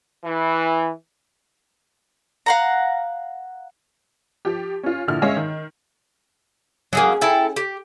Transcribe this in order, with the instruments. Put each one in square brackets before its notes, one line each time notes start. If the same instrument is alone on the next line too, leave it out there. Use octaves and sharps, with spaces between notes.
[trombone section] E3
[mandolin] F5 F#5 A#5
[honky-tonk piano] F3 G4
C#4 F4
A#1 D3 F3 E4 F6
G#3 C#4 C#5 E5 F5
D#3
[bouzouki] F#3 G#3 A#3 [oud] C#4 G#4
[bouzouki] E4 A4 G5
G4